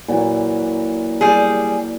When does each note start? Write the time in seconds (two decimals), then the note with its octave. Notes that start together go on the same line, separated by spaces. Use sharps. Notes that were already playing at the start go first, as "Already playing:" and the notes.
0.08 A#2 E3 F#3
1.21 G3 G#4